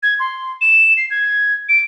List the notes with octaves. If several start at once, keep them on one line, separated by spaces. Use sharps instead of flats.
G#6
C6
E7
C7
G#6
D7